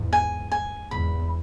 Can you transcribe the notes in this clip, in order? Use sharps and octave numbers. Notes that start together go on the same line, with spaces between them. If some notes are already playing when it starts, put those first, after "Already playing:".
Already playing: E2 G#2
G#5
G#5
E2 G#2 B5